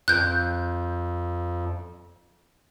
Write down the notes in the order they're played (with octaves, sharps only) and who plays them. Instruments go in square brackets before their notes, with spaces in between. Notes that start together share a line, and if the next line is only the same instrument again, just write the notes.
[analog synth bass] F2 [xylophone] F#6 G6